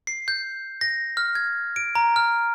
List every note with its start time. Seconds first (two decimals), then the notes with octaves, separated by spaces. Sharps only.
0.07 C7
0.28 G6
0.81 A#6
1.17 F6
1.35 G#6
1.76 D7
1.95 A#5
2.16 F6